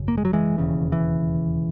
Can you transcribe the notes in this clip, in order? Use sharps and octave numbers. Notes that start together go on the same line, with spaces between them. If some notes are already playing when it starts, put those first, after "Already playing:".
Already playing: G#1 F#2 C#3
A#3
G#3
F#3
E3 G#3
E1 D#2 C#3
E3